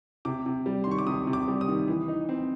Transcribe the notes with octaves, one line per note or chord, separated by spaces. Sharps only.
C3 D6
C3
G3
D#3 C6
C#6
D6
C3 D#6
C3
D6
G3
D#6
D#3
E3
D#4
C4